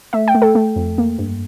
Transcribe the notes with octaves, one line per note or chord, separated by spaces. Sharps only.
A3 E5
G5
A3
A4
A3
F2
A#3
G2